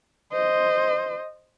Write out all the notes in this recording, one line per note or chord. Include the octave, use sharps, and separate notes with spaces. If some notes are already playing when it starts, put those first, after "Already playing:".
C5 D#5